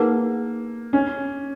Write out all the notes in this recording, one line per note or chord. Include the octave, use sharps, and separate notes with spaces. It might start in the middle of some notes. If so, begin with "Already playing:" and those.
Already playing: A#3 D#4 G#4 B4 F#5
C#4